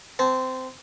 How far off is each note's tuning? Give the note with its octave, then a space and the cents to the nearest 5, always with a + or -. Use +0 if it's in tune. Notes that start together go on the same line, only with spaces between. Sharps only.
C4 -15 A5 -30